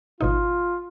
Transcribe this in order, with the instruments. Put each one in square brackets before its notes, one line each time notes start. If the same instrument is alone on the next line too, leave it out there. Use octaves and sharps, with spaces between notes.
[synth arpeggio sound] G#1 B2 D#4 [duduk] F4